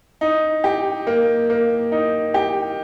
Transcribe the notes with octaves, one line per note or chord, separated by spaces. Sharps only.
D#4
G4
A#3
A#3
D#4
G4